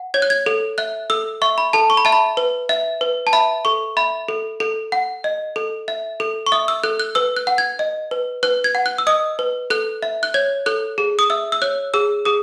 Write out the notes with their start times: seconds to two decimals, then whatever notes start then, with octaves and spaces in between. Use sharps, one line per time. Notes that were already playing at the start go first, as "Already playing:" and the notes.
Already playing: F#5
0.14 C#5 G#6
0.22 F#6
0.30 G#6
0.46 A4
0.78 E5 F#6
1.10 A4 E6
1.42 E5 C#6
1.58 B5
1.73 A4 A5
1.90 C#6
1.97 B5
2.05 E5 A5
2.12 B5
2.37 B4
2.69 E5
3.01 B4
3.27 A5
3.33 E5 B5
3.65 A4 C#6
3.97 E5 B5
4.28 A4
4.60 A4
4.92 F#5
5.24 D#5
5.56 A4
5.88 E5
6.20 A4
6.46 C#6
6.52 E5 D#6
6.68 E6
6.83 A4 F#6
7.00 F#6
7.15 B4 E6
7.36 F#6
7.47 F#5
7.58 G#6
7.79 D#5
8.11 B4
8.43 B4 F#6
8.64 G#6
8.75 F#5
8.86 F#6
8.98 E6
9.07 D#5 D#6
9.39 B4
9.70 A4 F#6
10.03 E5
10.23 F#6
10.34 C#5 G#6
10.66 A4 F#6
10.98 G#4
11.19 D#6
11.30 E5 E6
11.52 E6
11.62 C#5 F#6
11.94 G#4 E6
12.25 G#4 D#6